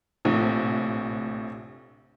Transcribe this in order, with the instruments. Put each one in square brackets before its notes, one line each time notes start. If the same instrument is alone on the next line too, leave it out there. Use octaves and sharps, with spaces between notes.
[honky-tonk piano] A#1 A2 C3